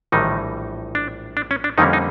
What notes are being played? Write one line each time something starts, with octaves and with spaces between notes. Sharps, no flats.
A#1 A2 D#3 E3 G3 D#4
D4
D4
C#4
D4
F2 D3 D#3 G3 A#3 C#4 D#4
D#4